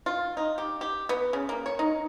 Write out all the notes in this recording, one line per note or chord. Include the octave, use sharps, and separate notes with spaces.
F4
D#4
G4
G4
B3
C#3
A#3
C#5
D#4